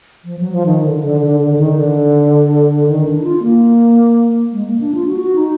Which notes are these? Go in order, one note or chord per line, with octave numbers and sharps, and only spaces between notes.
F3
F#3
F3
D#3
D3
D3
D3
D3
D3
D#3
D3
D#3
D4
D#4
F4
A#3
G#3
A#3
D4
F4
F#4
F#4
D#4